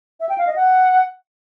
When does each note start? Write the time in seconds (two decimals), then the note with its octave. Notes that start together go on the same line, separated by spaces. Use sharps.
0.20 E5
0.29 G5
0.38 F5
0.47 D#5
0.56 F#5